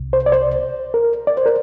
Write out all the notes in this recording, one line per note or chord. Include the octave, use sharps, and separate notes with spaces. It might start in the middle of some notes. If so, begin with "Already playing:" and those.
Already playing: C2 C3
C5
D5
C5
A#4
D5
C5
A#4